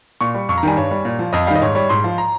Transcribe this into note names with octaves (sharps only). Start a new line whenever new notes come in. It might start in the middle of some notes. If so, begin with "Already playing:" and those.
A#2 C#6
G3
F2 C#6
A#5
D#3 G3 G#5
G2 C#5
G3
A#2
F3
F2 D#5
D#3 G3 F5
D#5
G#2 C#5
G3 C#5
G#2 C6
F3
A#5